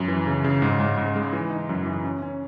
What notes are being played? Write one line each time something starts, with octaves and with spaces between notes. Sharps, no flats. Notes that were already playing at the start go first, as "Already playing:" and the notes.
Already playing: F#2
E3
C#3
C#3
G#2
G#2
G#2
G#3
E3
D#4
F#2
E3
C#4
C#4